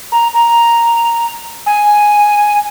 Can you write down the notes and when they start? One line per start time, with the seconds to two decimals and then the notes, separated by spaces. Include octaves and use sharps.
0.12 A#5
0.34 A#5
1.66 G#5